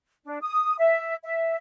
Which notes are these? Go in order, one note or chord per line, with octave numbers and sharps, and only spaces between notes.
D4
D#6
E5
E5